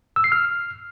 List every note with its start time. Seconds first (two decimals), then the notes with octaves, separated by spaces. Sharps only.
0.16 E6
0.24 C7
0.32 F6